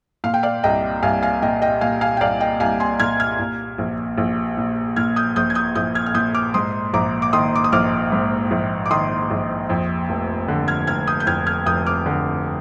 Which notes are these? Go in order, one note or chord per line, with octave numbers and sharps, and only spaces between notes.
A#2 F5
G5
D5 F5
C2 D#5 G5
C2 F5 G#5
F5 G#5
A#2 D#5 G5
D#5 G5
A#2 F5 G#5
F5 G#5
G5
C2 D5 F5
D#5 G5
C2 F5 G#5
G#5 C6
A#2 F6 G#6
F6 G#6
A#2
A#1
A#1
A#2
A#2 F6 G#6
D#6 G6
A#1 D#6 G6
G#6
D#6 G6
A#1 D#6 G6
F6 G#6
F6
A#2 D#6 G6
D6 F6
G#2 C6 D#6
A#1 A#5 D6
D6
D#3 C6 D#6
D6
D#6
A#1 D6 F6
G#2
A#1
D6
D#3 C6 D#6
A#1
F2
F1
D3
F6 G#6
F1 F6 G#6
D#6 G6
G6
F2 F6 G#6
F6 G#6
F1 D#6 G6
D6 F6
D3